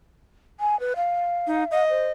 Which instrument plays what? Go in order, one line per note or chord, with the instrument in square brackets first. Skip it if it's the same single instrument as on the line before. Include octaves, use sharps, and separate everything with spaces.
[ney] G#5
B4
F5
[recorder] D#4
D#5
[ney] C5